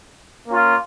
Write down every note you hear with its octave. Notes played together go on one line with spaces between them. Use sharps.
A#3 C#4 F4